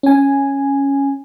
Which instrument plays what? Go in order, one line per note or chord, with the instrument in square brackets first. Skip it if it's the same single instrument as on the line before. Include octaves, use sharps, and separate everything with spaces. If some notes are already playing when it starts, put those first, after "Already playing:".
[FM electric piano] C#4 G#5